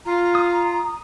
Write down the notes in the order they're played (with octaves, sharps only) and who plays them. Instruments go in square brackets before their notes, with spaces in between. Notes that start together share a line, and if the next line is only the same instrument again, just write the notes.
[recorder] F4 [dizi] A#5
[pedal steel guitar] D#6